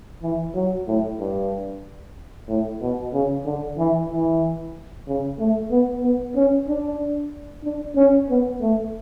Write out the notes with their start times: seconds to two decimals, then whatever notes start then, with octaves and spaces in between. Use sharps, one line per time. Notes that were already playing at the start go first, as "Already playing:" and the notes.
0.22 E3
0.55 F#3
0.87 A2
1.19 G2
2.48 A2
2.81 B2
3.13 C#3
3.45 D3
3.78 E3
4.10 E3
5.07 C#3
5.39 A3
5.71 B3
6.03 B3
6.35 C#4
6.68 D4
7.64 D4
7.96 C#4
8.30 B3
8.61 A3